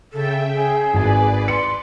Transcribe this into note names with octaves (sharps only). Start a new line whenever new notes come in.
C#3 A4 E5 G5
G#4
G#1 B4 D5 G#5
C6 C#7